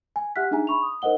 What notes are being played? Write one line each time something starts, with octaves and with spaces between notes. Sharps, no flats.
G#5
G4 E5 F#5 F6 F#6 B6
D4 D#4 G#4 E5 G#5 A#5
B5 C#6 F7
D#6
D#4 A#4 C5 D#5 F#5 G7